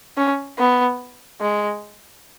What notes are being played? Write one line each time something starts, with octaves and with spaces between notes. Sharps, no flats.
C#4
B3
G#3